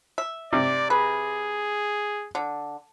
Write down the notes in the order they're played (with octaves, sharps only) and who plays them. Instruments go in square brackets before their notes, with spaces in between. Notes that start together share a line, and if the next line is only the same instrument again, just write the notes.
[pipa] E5
[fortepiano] C3 [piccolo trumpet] D5
[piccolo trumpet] G#4 [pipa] B4
[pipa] D3